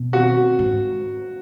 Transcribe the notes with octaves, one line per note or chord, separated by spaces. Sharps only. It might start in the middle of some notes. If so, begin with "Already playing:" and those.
Already playing: B2
F#4
G#2